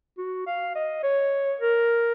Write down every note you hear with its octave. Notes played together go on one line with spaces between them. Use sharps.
F#4
F5
D#5
C#5
A#4